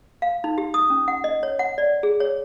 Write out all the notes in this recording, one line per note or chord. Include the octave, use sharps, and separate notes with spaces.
F5
D#4
G4
D#6
C#4
F#5
D#5
C#5
F#5
D5
G#4
C#5